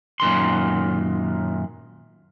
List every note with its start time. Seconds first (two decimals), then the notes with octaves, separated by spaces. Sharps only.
0.20 F#2 A#2 D#3 C6